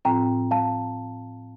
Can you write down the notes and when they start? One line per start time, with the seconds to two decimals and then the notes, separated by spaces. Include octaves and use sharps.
0.05 A2 F3 C4 F4 G5 A#5
0.51 F5 A5